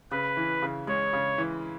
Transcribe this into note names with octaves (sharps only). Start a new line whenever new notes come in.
C#3 B4
E3
C#3
G#3 C#5
C#3
E3